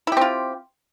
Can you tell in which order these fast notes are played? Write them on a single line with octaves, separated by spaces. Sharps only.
E4 G4 C4 F4